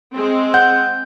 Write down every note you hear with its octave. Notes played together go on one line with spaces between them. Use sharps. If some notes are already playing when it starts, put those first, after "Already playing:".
G#3 C4
F#5 G6